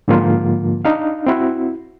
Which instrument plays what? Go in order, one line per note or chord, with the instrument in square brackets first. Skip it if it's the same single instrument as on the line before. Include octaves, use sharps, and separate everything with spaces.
[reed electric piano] G#2 D3 F3 A#3 F4
D4 D#4 F5
C4 E4 F#4